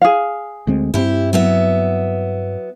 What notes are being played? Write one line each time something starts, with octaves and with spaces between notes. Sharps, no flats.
G#4 F5
D2 G#3 C4
G2 C4 E4 G4
F#3 B3 E5